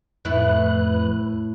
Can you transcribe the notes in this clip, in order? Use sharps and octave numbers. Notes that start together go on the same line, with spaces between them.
F2 A2 A3 E4 B4 F#6